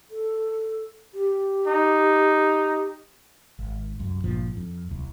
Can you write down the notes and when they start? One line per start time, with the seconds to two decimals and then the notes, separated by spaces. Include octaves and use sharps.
0.11 A4
1.14 G4
1.67 D#4
3.59 G#1
3.99 C2 F#2
4.24 G#1 G2 A#2 F3
4.57 F2
4.89 D1 C2